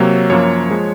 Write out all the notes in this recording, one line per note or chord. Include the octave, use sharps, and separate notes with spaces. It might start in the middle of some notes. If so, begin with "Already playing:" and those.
Already playing: C3 F#3 A#3 C#5
F#2 F3 A#3 C#5
F3 G#3